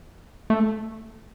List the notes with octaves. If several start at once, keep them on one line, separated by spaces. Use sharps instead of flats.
A3